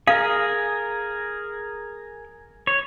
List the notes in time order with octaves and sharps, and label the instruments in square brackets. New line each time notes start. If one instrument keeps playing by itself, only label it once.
[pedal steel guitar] G#4 A#4 [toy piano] F5
[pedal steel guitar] C#5